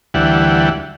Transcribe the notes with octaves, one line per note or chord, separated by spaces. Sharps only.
D2 E3 G3 F#5